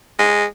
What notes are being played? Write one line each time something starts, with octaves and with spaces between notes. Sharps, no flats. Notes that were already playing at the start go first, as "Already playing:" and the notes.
G#3